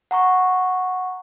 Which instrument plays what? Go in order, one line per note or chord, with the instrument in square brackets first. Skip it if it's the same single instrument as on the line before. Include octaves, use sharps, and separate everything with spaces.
[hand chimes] F#5 A#5 C#6